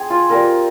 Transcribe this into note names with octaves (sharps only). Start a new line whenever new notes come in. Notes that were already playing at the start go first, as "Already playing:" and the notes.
Already playing: C4 G#4
F4
G3 C4 F4 A#4